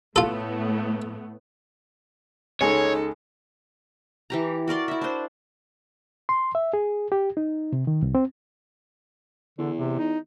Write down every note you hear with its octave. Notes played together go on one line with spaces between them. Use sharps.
A2 A3 B3 F4 A4
C#2 G#3 D#4 A4 C#5 G#5
E3 G4 A#5
F#4 A#4 D5 C6
E4 E5
D4 C5
C6
E5
G#4
G4
D#4
C3
D#3
C2
C4
E2 D3
C3
D#4